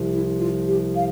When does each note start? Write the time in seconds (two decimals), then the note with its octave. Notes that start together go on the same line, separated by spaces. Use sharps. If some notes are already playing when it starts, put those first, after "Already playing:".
Already playing: C2 C3 F3
0.12 E4
0.40 F4
0.67 G4
0.95 F5